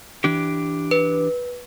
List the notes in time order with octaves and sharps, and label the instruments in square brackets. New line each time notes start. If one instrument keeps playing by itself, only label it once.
[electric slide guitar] E3 D4 G4
[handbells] B4